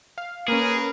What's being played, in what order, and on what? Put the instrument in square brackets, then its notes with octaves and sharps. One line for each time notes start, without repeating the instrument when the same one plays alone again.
[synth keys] F5
[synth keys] A#3 C#4 [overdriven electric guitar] G#4 [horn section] A#4 B4